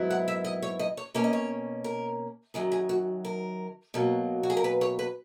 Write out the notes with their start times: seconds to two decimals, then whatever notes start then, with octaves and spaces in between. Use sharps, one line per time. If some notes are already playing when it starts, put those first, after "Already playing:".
Already playing: G#2 D#3 F#3 B3 E4
0.10 F#5
0.28 E5
0.44 D#5
0.62 C#5
0.79 D#5
0.97 C#5
1.14 B2 A#3 C#4 C#5
1.24 D#5
1.33 C#5
1.84 A#4
2.54 F#2 D#3 F#3 G#4
2.72 G#4
2.89 F#4
3.25 A#4
3.94 B2 F#3 A#3
4.43 F#4
4.50 G#4
4.57 A#4
4.64 B4
4.81 C#5
4.99 B4